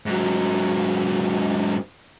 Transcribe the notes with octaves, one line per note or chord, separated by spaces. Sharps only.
G#2 F#3